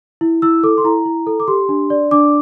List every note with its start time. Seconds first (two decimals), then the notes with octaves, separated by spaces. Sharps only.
0.21 E4
0.42 E4 E6
0.63 A4 D6
0.78 C6
0.84 E4 A#5
1.06 E4
1.27 A4
1.40 D6
1.48 G4 C6
1.69 D4
1.90 D5
2.11 D4 D6